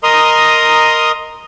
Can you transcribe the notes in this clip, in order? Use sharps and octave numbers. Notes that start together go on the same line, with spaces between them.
A#4 D#5 A#5 C6 D#6